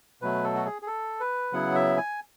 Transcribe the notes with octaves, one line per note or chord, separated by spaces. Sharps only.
B2 F#3 A3 B4
A4
F#4
G#4
G#4
A4
B4
C#3 F#3 B3 E4 F#5
E5
G#5